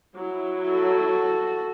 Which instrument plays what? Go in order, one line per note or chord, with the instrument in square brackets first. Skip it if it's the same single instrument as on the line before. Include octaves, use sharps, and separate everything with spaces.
[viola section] F#3 E4
[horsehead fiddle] F#4 A4